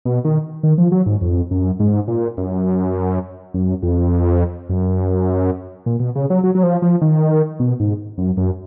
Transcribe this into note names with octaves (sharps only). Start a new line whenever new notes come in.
B2
D#3
D#3
F3
F#3
G#2
F2
F#2
G#2
A#2
F#2
F#2
F2
F#2
A#2
B2
C#3
F#3
F#3
F#3
F3
F3
D#3
B2
G#2
F#2
F#2